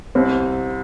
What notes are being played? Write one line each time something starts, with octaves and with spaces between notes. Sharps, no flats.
C2 C4